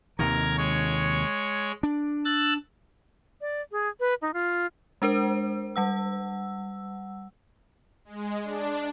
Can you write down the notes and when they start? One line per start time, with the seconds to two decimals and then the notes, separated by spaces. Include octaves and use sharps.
0.19 D#2 C3 D#3 A#4 G#6
0.57 G#3 C#5 C#6
1.83 D4
2.25 E6 F#6 A6
3.41 D5
3.72 G#4
4.00 B4
4.22 D#4
4.34 F4
5.02 G#3 D4 A#4 C5
5.76 G3 F#5 E6
8.05 G#3
8.42 D4